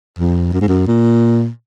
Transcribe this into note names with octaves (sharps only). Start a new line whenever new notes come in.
F2
F#2
G#2
F#2
A#2